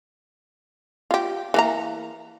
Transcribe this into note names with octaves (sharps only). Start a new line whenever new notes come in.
F4 G4
E3 A#3 A#5